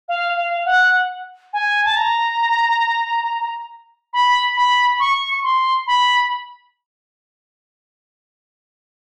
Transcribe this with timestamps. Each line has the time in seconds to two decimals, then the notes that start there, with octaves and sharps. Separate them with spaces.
0.09 F5
0.37 F5
0.65 F#5
1.53 G#5
1.85 A5
1.96 A#5
4.13 B5
4.56 B5
5.00 C#6
5.43 C6
5.87 B5